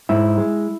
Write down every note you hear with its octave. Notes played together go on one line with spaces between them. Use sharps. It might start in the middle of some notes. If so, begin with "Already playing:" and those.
G#2 E4
G#3